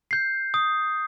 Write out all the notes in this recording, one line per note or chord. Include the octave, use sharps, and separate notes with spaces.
G6 C7
D#6